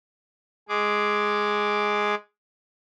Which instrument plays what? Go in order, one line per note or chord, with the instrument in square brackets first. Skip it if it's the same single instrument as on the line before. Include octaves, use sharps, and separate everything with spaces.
[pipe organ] G#3 G#4 D6